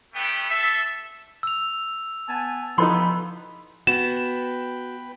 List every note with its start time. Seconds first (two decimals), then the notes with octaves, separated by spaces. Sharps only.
0.13 G3 A3 B3 A4 G5
0.49 A4 E5
1.43 E6 F7
2.27 B3 G#5 A5
2.78 E3 F3 G3 B3 D#4 A4 B5 C6
3.87 B3 F#4 B4 G5 B5 E7